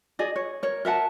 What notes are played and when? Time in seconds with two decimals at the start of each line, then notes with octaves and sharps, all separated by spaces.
0.19 G#4 D5 D#5
0.36 C#5
0.63 A#4 C#5
0.85 A#4 E5 F#5 A5